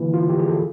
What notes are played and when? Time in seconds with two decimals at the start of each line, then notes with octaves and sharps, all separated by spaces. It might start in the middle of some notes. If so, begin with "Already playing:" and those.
Already playing: D3 E3 G3 A#3 E4
0.14 F3 F4
0.29 G4
0.39 G#4
0.49 A4